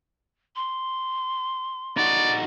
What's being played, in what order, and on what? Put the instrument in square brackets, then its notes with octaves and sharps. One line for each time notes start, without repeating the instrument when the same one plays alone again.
[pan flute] C6
[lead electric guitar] D#4 F#4 [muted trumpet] D5